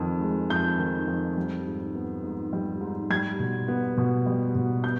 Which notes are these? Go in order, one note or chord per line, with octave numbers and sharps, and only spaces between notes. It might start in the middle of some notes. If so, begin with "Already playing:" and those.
Already playing: F2 D#3
G#3
F2 G6
D#3
F2
G3
G#2
B3
G#2
G3
G#2
G3 G#6
B2
B3
B2
G3
B2
B3 G6